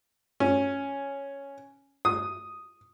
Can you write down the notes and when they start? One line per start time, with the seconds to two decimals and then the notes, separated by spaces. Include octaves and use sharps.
0.40 C#4
2.05 D#6